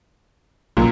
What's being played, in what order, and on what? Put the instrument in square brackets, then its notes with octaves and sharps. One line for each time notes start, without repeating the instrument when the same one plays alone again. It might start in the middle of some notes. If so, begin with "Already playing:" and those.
[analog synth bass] B1 [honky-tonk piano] F#2 A#2